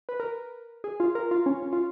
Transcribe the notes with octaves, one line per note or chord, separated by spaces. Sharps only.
B4
A#4
G#4
F4
A#4
F4
C#4
C#4
F4